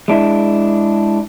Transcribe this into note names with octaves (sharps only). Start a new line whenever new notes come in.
G#3 D4 E4